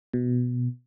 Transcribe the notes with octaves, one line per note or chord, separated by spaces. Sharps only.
B2